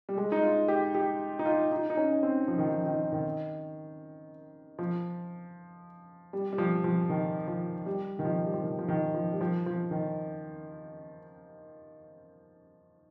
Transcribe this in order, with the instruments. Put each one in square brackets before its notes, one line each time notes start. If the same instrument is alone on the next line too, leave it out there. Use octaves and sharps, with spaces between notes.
[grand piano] G3
G#3
D#4
F4
G4
G4
D#4
F4
D#4
D#4
C#4
C4
F3
D#3
F3
D#3
D#3
F3
G3
G3
F3
F3
D#3
F3
G3
D#3
F3
G3
F3
D#3
F3
D#3
F3
G3
F3
F3
D#3